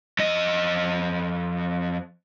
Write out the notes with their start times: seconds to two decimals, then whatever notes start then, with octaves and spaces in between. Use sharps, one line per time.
0.19 F2 D#5